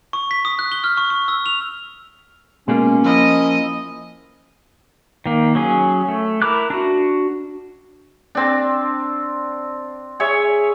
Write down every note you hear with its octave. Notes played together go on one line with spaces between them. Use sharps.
C#6
B6
D#6
F#6
G7
F6
C#6
C#6
E6
F7
B2 G#3 A#3 C#4
F3 A#3 E4 D#5
D#3 A#3
F#3 C#4 G#4
A3
E4 A#4 B5 D6 F#6
D4 F#4
C4 D4
G#4 C#5 E5